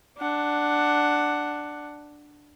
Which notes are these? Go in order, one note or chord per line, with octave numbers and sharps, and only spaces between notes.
D4 F#5